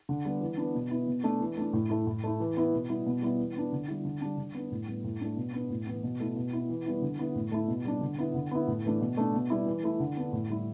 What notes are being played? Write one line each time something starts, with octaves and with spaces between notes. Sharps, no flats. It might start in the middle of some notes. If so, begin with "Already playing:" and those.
D3
G3 B3
E3
B3 D4
B2
B3 E4
B2
A3 D4
E3
A3 D4
A2
A3 E4
A2
A3 E4
E3
B3 E4
B2
G3 B3 E4
B2
G3 B3 E4
E3
B3 D4
D3
G3 E4
D3
G3 D4
D3
B3 D4
A2
G3 B3
A2
A3 D4
B2
B3 D4
A2
E3 B3
B2
A3 E4
B2
B3 E4
E3
G3 B3 E4
D3
B3 E4
A2
A3 E4
B2
G3 D4
D3
B3 E4
D3
B3 E4
A2
E3 A3 D4
B2
A3 D4
B2
G3 B3 E4
E3
A3 E4
D3
B3 D4
A2
G3 E4